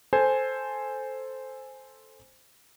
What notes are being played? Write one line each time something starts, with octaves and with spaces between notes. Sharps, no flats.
A4 C5 G#5